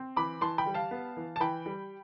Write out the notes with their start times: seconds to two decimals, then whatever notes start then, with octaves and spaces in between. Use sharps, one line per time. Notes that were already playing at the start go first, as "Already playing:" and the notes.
Already playing: C4
0.16 E3 B5 D6
0.41 E3 A5 C6
0.58 G5 B5
0.66 G3
0.74 F5 A5
0.91 B3
1.17 E3
1.36 A5
1.40 E3 G5 B5
1.66 G3